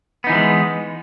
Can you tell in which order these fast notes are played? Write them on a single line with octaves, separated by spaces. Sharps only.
B3 D#4 E3 F3 G#3